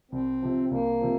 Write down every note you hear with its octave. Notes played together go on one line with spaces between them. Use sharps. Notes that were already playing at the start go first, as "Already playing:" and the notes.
C2 C4
C3 F3
C2 A#3
C3 F3